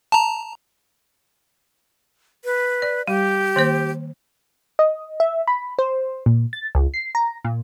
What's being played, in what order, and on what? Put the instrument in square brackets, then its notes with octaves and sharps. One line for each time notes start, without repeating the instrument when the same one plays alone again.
[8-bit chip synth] A5 A#5
[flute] B4
[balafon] D5
[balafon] G3 [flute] G4
[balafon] D#3 A#3 C5
[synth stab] D#5
E5
B5
C5
A#2
A6
C#2
C7
A#5
A#2